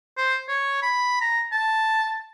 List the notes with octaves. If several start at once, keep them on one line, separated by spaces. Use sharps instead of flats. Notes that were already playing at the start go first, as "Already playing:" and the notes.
C5
C#5
B5
A#5
A5